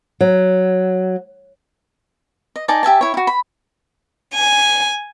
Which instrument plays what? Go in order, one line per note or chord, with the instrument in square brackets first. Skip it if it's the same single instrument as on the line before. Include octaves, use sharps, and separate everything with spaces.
[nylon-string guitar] F#3
[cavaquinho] D#5
D#4 D5 G#5 A5
G4 E5 G#5 A5
E4 C#5
E4 F#4
B5
[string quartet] G#5